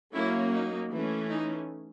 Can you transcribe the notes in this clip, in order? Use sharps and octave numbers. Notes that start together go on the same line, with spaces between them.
F#3 A#3 C#4 E4
D#4
E3 A3 C#4
D#4